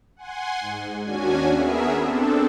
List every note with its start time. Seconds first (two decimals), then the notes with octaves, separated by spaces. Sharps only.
0.16 F#5 G#5 C6
0.61 G#2
1.03 D#2 C#4 D4 F#4 G#5
1.52 B3 G#4 A#4 E5
1.98 C4 D4 A4